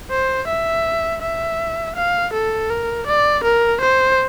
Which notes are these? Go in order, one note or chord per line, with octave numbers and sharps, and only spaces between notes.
C5
E5
E5
F5
A4
A#4
D5
A#4
C5